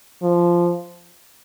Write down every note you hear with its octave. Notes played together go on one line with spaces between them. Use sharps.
F3